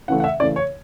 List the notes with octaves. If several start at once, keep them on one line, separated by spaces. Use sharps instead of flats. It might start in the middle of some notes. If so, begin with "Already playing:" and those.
C#3 E3 A3 F#5
F#5
E5
C#3 E3 A3 D5
C#5